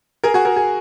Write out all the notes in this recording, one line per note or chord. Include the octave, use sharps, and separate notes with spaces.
G#4 A#4
F#4 G#4
G#4 A#4
G#4